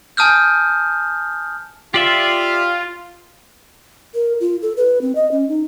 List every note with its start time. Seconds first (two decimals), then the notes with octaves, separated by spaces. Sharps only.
0.17 G#5 A5 D#6 F6 G6
1.94 F4 G4 D5 E5
4.14 A#4
4.40 F4
4.62 A4
4.77 B4
5.02 C4
5.15 D#5
5.31 C#4
5.49 D#4